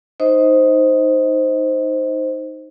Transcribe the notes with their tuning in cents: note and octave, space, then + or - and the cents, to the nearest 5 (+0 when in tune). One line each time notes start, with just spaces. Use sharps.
D#4 +0 C5 +0 D#5 +25